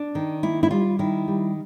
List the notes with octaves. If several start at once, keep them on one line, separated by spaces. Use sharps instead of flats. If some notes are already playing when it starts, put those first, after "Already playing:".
Already playing: D4
D#3
A#3 E4
E4
G3 F4
D#3 E4
G3